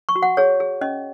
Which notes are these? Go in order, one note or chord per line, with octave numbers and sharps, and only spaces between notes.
C#6
F#4
F#5
G#4 C#5
G#4
C#4 D#5